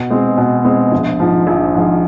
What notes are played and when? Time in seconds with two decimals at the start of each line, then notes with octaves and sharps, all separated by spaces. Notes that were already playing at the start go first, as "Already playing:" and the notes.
Already playing: B2
0.11 G#3 C4
0.37 B2
0.65 G#3 C4
0.92 A#1
1.20 G#2 F3
1.47 A#1
1.74 G#2 F3